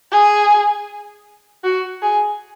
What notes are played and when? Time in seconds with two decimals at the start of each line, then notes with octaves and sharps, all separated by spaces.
0.12 G#4
1.64 F#4
2.02 G#4